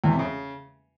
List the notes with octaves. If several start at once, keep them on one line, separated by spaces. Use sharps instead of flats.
E2
C3
C#3